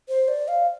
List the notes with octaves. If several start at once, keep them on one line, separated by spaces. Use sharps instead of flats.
C5
D5
F5